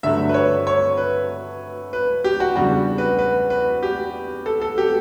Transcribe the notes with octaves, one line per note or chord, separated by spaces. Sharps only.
G2 D3 F#3 A3 D4 E5
B4
C#5
C#5
B4
B4
G4
F#4
E2 C#3 G3 D4 F#4
B4
B4
B4
G4
A4
A4
G4